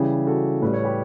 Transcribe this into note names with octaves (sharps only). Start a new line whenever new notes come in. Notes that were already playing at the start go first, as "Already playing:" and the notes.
Already playing: C#3 E3 G3 E4 G4
F#4 A4
A2 G3 B4
C#5
G4 B4